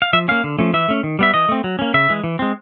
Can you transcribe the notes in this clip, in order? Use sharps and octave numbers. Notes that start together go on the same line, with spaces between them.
F5
F3 E5
A#3 C#4 F5
D3
F3 A3 C#4
E3 E5
A3 C#4
D#3
G3 B3 E5
E3 D#5
A3 C4
F#3
A#3 C#4
C#3 E5
E3 G#3
E3
G#3 C4